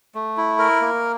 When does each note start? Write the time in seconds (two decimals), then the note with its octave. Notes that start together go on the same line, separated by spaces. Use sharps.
0.15 A3
0.37 E4
0.59 A#4
0.82 A#3